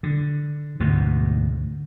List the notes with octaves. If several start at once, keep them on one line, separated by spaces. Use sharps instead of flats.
D3
D2 G#2 B2